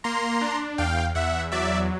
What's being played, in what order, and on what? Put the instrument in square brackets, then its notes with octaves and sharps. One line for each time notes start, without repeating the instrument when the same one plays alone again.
[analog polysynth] A#3 A#5 C6
D4
E2 F5 G5
E2 E5 F#5
F#3 D5 E5